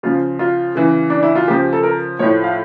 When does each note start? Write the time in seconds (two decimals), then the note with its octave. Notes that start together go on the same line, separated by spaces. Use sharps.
0.03 C#3 F3 F4
0.39 F4
0.75 C#3 E3
1.10 D4
1.23 E4
1.35 F4
1.48 C#3 F3 G4
1.73 A4
1.83 A#4
2.19 A2 F3 C#5
2.44 F5